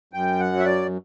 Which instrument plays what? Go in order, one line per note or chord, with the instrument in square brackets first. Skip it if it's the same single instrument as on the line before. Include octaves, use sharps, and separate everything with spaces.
[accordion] F#2 G5
F#5
F#3
E5
D5